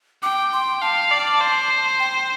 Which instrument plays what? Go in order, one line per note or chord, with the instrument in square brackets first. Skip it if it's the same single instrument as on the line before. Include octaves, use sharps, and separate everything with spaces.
[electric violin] G5 [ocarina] D6
[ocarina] C6
[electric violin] F5 [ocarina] A5
[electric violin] D5
C5
[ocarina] G5